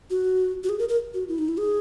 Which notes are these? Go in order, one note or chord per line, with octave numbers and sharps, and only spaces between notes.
F#4
F#4
G#4
A#4
A#4
F#4
E4
D#4
E4
G#4